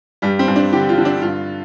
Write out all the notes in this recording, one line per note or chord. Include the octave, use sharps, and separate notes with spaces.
G2 G3
C4
G2
D4
D3 G4
F4
D3
D4
G2 F4